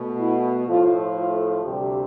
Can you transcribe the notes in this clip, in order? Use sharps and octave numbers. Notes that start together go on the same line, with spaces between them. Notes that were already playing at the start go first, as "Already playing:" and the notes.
Already playing: B2 A3
E4
A2 F3 A3 F4
F4
D2 C3 G3 G4